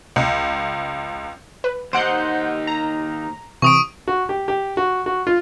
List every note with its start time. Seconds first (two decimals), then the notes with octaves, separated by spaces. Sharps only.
0.16 C#2
1.64 B4
1.93 D#2 D#4 C5 F#5 G6 D7
2.67 A#5
3.62 C3 E3 C#6 D#6 D7
4.08 F#4
4.29 G4
4.48 G4
4.77 F#4
5.06 F#4
5.27 F4